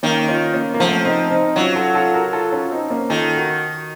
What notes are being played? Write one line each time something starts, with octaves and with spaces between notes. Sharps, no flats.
D#3 A#3 C#4
C#4 F4
A#3 C#4
A#3
F3 A3 C4
C4 D#4
C4 D#4
F#3 C#4 F4
F4 A4
F4 A4
F#4 A#4
F4 A4
C#4 F4
C4 D#4
A#3 C#4
D#3 F4 A4
F#4 A#4